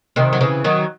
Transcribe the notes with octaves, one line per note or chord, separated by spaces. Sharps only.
C3 D#3
F#3
C#3 E3
D#3 F#3